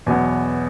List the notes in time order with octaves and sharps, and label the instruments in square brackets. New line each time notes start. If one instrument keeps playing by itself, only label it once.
[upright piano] E2 B2 F#3 B3 G#5